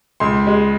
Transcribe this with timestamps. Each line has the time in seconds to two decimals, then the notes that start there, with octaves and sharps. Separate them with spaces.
0.20 C#2 C6
0.47 G#3